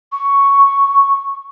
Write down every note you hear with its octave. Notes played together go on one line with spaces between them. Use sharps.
C#6